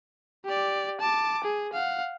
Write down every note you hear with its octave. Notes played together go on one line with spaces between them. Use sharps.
G4 D5
A5 D6
G#4
F5 F#5